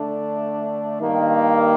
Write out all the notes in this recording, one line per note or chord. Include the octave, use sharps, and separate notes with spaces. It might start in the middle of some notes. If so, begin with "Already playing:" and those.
Already playing: D3 A3 D4
G2 D#3 A#3